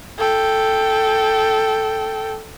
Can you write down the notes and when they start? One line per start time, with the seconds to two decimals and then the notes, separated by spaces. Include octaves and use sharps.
0.19 A4 G5